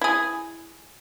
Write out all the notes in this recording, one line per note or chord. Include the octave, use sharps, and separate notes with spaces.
E4 G#4